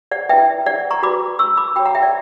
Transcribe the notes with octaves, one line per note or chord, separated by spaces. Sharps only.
D5 F#5
E4 B4 E5 G5
D5 F#5
A#5 C#6
F#4 B4 B5 D6
C#6 E6
B5 D6
F#4 C#5 G5 B5
F#5 A#5
E5 G5
D5